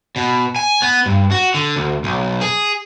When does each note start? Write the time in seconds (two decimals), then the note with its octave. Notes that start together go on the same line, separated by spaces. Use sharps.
0.16 B2
0.56 G#5
0.82 B3
1.06 G2
1.31 F#4
1.54 D3
1.76 D2
2.04 B1
2.41 G#4